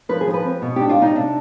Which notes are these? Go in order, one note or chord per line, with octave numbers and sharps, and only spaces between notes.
F3 B4
G#4
F3
B4
C4
B2
D4 G4
F4
B2 D#4
C3 D4